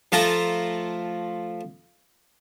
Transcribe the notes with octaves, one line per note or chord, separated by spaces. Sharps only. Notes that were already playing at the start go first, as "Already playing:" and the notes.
F3 A3 F4 A5 A#5